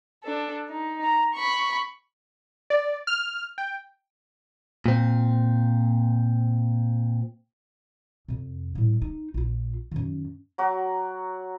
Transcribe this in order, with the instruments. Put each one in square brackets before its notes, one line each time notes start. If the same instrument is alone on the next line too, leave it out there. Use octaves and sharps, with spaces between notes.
[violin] D4 A4
D#4
A#5
B5 C#6
[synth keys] D5
F6
G5
[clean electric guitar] A#2 C4
[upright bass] F2 C3
A2 G3
D#4
A#1 F4
F#2 D#3
[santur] F#3 F#4 D6